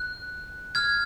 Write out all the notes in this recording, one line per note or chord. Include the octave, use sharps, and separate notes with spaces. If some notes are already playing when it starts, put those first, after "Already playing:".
Already playing: F#6
F6 G#6